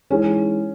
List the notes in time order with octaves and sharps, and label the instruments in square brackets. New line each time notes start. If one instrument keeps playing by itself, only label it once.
[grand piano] E3 G#3 D#4 G#4 [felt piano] C#4